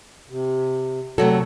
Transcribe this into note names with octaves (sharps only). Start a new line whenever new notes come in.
C3
C3 F#3 A3 F#4 A4